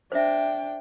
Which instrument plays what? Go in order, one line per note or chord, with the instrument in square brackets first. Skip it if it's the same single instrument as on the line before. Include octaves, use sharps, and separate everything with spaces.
[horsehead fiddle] D4 G5 [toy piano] C5 E5